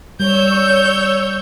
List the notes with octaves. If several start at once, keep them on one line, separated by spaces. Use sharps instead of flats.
G3 C#5 E6 G6